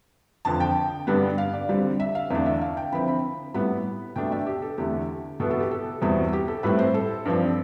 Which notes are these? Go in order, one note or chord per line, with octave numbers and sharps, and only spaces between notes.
F2 D3 F3 A5
G5
G2 D3 G3 B3
F5
D5
D3 G3 C4
E5
F5
E2 D3 A3 D4 E5
E5
F5
G5
D3 F3 C4 E4 B5
B5
A2 G3 B3 E4 B5
B2 A3 D4 G5
E5
G4
A4
E2 D3 A3 G4
B2 B3 E4 A4
A4
G4
A4
E2 B2 G3 C4 E4
G4
A4
A2 G3 C4 E4 B4
C5
A4
G2 F3 C4